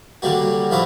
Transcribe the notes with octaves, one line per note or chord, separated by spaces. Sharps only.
D3 F#3 G3 A#3 F#4
A#1 F3 E4 F#4 F5 A#5